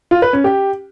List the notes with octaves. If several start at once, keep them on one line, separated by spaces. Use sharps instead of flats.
F4
B4
C#4
G4